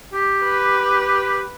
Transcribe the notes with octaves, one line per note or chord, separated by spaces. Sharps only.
G4
B4